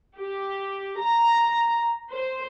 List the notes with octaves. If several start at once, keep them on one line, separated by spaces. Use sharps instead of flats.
G4
A#5
C5